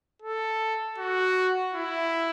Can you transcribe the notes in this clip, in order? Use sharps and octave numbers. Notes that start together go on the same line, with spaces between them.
A4
F#4
E4